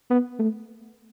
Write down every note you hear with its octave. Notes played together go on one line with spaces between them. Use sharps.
B3
A3